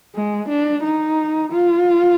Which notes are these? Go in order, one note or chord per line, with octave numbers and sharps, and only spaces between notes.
G#3
D4
D#4
F4